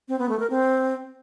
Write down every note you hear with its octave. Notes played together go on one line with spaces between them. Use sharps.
C4
B3
A3
A#4
C4